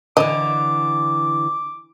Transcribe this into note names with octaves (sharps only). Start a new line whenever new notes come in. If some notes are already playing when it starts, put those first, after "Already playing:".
D3 E3 D#5 D6